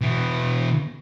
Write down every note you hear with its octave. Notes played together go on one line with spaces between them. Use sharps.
B2 E3